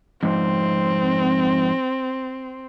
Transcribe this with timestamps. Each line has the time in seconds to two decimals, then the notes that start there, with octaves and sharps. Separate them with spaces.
0.23 F2 G#2 C4